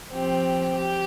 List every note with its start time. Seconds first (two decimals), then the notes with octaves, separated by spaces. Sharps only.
0.11 F3 C4 G4
0.75 G4